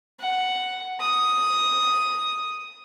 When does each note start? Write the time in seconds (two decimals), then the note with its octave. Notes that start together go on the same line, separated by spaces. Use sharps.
0.20 F#5
1.00 D#6